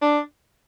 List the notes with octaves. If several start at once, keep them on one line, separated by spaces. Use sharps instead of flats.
D4